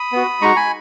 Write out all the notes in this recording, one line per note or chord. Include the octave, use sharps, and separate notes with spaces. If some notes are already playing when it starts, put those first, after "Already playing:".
Already playing: B5 D#6
B3 F#4
G#3 D#4 F#4 A#5 C#6
G#5 B5